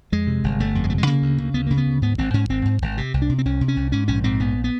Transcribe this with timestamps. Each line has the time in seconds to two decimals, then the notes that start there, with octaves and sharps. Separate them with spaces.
0.12 F2 G#3
0.27 C3
0.44 G1
0.60 G1 A3
0.75 F2
0.84 G#3
0.90 C3 A3
0.98 G#3
1.07 C#3 A#3
1.22 D2
1.38 C#3
1.54 D2 B3
1.67 C#3 A#3
1.77 B3
1.86 D2
2.02 G#2 B3
2.18 G#1 C4
2.34 G#2 C#4
2.49 G#1 C4
2.65 G#2
2.82 G#1
2.97 C3
3.14 C2
3.22 D4
3.29 C3
3.38 C4
3.45 C2 C#4
3.61 C3
3.68 C#4
3.76 C2
3.92 G#2 C#4
4.08 A#1 C#4
4.24 G#2 C4
4.40 A#1 B3
4.64 B3